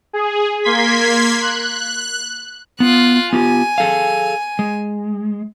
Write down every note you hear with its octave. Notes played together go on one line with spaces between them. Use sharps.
G#4
A#3 C6 G#6 B6
F#6
B3 F4 F#6
B3 F4 G4 G#5
G#4 A4 F5
G#3